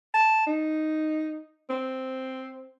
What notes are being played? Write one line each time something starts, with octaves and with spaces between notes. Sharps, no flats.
A5
D#4
C4